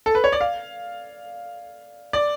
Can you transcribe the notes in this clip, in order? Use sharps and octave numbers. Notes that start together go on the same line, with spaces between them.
A4
B4
C#5
D5
F5
D5